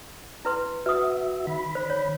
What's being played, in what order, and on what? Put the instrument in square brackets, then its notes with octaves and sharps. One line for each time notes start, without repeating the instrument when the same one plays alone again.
[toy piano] E4 B4 C6
[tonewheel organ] F#4 E5 [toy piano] B4 D#6
[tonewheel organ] D#3 B5
[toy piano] C5
C#5